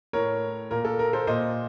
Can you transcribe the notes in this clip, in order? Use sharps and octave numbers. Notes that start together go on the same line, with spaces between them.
A2 A#4 C#5
A#2 A#4
A4
A#4
A4 C5
A#2 C5 D#5